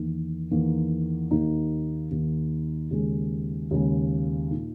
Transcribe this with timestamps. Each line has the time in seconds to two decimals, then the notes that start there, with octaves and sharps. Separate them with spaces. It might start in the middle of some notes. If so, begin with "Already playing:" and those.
Already playing: E2 D#3 A#3
0.51 E2 D#3 A#3
1.31 D#2 D#3 A#3 D#4
2.11 D#2 D#3 A#3 D#4
2.91 D#2 C#3 G#3
3.71 D#2 C#3 G#3
4.50 A#2 A#3 D#4